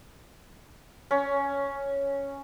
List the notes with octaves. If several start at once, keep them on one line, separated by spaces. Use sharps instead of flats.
C#4